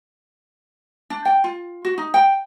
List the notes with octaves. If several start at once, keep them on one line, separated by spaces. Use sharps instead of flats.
D4
G5
F4
F#4
D#4
G5